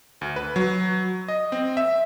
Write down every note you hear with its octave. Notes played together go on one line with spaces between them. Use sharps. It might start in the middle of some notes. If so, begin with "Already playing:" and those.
D2
B4
F#3
D#5
C4
E5